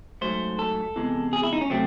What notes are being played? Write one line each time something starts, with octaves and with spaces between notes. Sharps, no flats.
G#2 F#3 A3 C5
A4
E2 C3 E3 G#3
G#4
E4
D#4
C#4
C3 F#3 A3 C4